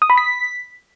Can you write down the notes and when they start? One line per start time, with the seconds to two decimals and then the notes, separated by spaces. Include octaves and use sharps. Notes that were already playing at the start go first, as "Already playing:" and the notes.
0.02 D#6
0.10 B5
0.17 B6